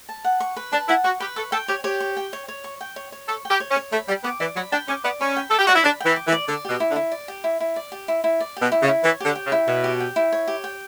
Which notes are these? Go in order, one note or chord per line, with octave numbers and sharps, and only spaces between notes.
A5
F#5
C#6
B4
D4 A5
E4 F#5
F#4 C#6
G4 B4
A4 C#6
A4 G5
G4 C#5
G4 C#5
C#6
G5
C#5
C#5
C#6
G5
C#5
C#5
A4 C#6
G5
G4
C#5
C#4
C#5
A3 B5
G3 G5
B3 D6
E3 D5
F#3 B5
D4 G5
C#4 D6
B3 D5
C#4 B5
G5
A4 D6
G4
F#4 D5
E4
D4 B5
G5
E3
D6
E3
D5
D3 D5
B2 G4
E4
D3
E4
D5
G4
E4
E4
D5
G4
E4
E4
D5
B2 G4
E4
C#3
E4
E3 C#5
D3 G4
G5
C#3
E4
B2 C#5
G4
G5
E4
C#5
G4
G5